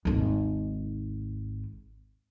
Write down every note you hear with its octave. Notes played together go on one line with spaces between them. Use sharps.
G#1 D#2